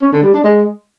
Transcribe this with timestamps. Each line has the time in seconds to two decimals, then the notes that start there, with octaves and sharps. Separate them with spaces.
0.02 C#4
0.13 D3
0.23 G3
0.34 D4
0.44 G#3